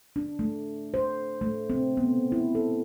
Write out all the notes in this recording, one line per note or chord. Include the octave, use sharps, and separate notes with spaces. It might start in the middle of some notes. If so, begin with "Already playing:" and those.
D4
A3
C5
A3
C4
B3
E4
A4